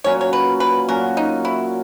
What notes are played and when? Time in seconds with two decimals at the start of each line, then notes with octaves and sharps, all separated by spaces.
0.04 A#2 F#3 C#4 F#4 C#5
0.21 C#5
0.33 B4
0.60 B4
0.88 A#2 F#3 C#4 F#4 A#4
1.17 D#4
1.45 E4